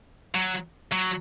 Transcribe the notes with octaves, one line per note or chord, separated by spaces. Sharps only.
F#3
F#3